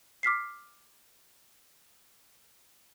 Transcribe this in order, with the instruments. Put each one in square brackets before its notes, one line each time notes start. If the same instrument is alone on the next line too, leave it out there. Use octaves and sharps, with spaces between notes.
[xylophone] D6 F6 B6 C7